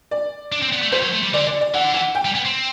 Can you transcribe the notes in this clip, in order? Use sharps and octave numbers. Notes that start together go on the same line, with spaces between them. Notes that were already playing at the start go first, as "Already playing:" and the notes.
D5
D4
C4
B3
A3
G3 C5
F#3
A3
G3
D3 D5
D5
D5
E3 F#5
D3
E3 F#5
G5
G3
B3
C4